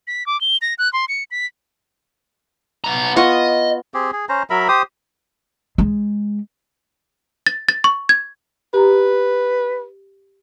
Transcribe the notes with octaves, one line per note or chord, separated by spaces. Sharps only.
B6
D6
G7
A#6
F#6
C6
C#7
B6
B3 A#5
B3 F4 D#5 C#6
C4 G4 G#4
G#4
C#4 C5 A#5
F#3 A#4 E5 B5
G4 C5 D#6
G#3
A6
A6
C#6
G#6
G4 B4 A#5